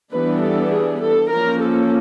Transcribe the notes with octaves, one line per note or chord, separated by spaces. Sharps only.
E3 G3 B3 D4 B4
A4
G#4
A4
F3 A#3 C#4 A#4
A4